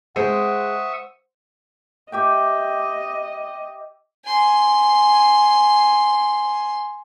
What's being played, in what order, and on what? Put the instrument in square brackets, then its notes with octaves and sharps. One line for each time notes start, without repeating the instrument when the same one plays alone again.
[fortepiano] G#3 [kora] C5 [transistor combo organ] E5 C#6 D#6 [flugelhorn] F#5
[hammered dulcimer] G4 E5 G5 [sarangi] D#5
[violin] G#5 C6